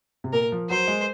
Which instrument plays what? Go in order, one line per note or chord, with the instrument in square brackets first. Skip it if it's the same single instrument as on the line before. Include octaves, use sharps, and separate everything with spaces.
[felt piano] C3
[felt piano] A#2 [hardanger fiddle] A#4
[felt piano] F3
[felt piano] F#3 [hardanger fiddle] C5
[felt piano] G#3